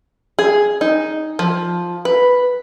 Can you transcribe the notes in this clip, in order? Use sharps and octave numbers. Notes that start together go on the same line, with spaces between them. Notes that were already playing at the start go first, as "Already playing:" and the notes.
G#4
D#4
F3
B4